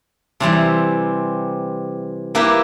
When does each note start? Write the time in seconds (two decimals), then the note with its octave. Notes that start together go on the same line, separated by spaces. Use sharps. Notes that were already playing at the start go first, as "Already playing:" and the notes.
0.40 C3 E3 G3 C4
2.35 A#3 E4 G4 B4